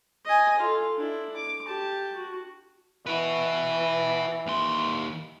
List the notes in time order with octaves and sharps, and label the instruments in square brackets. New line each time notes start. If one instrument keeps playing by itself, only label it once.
[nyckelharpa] D#5 G#5
F4 A4
D4 E4
D6
G4 A5
F#4
[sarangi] E3 [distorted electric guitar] F#4 B4
[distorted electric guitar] D#2 C6